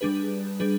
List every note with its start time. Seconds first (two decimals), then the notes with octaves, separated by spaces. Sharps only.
0.01 G3 D4 G#4 B4
0.60 G3 D4 G#4 B4